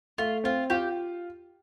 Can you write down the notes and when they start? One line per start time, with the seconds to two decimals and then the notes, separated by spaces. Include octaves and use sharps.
0.18 A3 F4
0.44 C4 F4
0.70 F4 G4